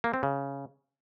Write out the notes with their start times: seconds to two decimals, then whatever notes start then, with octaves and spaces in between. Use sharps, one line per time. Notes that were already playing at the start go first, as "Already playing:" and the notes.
0.04 A#3
0.14 C4
0.23 C#3